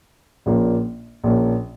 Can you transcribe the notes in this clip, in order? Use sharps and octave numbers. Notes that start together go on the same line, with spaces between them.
A#1 A#2 F3 A#3 C#4
A#1 A#2 F3 A#3 C#4